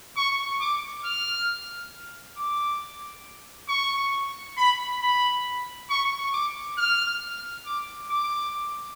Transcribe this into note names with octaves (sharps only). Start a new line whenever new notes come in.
C#6
D6
F6
D6
C#6
B5
B5
C#6
D6
F6
D6
D6